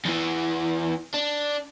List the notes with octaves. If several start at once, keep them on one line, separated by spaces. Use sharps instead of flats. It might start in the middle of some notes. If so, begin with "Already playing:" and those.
E2 E3
D4